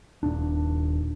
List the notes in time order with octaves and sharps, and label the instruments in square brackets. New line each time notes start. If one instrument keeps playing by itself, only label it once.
[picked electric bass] D#1 D4